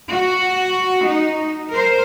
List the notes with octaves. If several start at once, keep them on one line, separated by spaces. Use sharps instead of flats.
F#4
D#4
A#4 C5